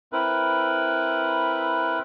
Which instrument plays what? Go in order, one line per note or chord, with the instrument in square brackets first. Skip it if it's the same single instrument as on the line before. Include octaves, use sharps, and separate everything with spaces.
[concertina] C4 E4 A#4 B4